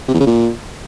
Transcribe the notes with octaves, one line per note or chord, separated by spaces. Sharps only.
C3
E2
C#3
A#2